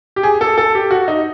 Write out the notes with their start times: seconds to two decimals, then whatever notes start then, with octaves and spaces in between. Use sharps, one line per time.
0.16 G4
0.23 G#4
0.41 A4
0.58 A4
0.75 G4
0.91 F#4
1.08 D#4